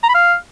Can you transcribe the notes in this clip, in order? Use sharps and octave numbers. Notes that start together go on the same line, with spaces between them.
A#5
B5
F5